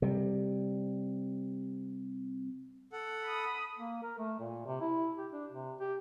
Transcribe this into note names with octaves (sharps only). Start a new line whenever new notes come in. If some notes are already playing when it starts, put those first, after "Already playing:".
C3 G3
A4 F#5
B5 D#6
A#3
A#4
A3
A#2
C3
E4
G4
D4
C3
G4